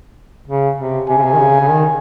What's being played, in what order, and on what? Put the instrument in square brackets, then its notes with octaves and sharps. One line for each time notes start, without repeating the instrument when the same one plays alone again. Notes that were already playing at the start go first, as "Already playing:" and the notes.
[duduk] C#3
C3
[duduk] C3 [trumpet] G#5
[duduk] C#3
C3
D#3
C#3
C#3
D#3